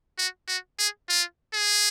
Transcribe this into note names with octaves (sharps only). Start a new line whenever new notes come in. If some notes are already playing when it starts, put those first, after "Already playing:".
F#4
F#4
G#4
F4
G#4